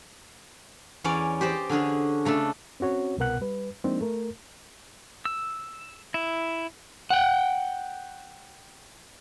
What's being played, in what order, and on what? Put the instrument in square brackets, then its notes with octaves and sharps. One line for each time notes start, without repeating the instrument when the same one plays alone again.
[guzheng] E2 C#4 C#5 D5
G4 C5 D5 D#5
D3 C#4 D4 G#4
C#3 A3 D4 A4
[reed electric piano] C4 C#4 F#4 C#5
C2 B2 B3 A#4 F#5 F#6
G3 B4
F3 G#3 A#3 C4 D4 D#4
A3 A#4
[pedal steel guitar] E6
E4
[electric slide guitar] F#5 G5